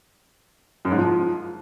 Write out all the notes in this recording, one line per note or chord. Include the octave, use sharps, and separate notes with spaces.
F#2
G#2
F3